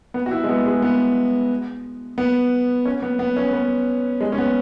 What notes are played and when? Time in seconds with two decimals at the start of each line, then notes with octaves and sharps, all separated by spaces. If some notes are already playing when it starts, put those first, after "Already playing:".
0.14 B3
0.26 F#4
0.31 E4
0.44 G#3
0.49 B3
0.66 G#3
0.82 B3
2.18 B3
2.85 C#4
3.02 B3
3.19 B3
3.36 C#4
3.53 B3
4.21 G#3
4.32 C#4
4.38 B3